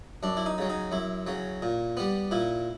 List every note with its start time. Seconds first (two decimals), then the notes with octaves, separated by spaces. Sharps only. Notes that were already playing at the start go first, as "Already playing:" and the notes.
0.23 F#2 D4
0.37 E4
0.46 D#4
0.58 C#3 F#3
0.70 D#4
0.92 F#2 E4
1.27 C#3 F#3
1.62 A#2
1.97 G3 B3
2.31 A#2 E4